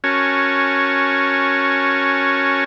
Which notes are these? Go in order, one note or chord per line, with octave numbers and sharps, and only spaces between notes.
C#4 F#4 A#4 C#5 G#5 A5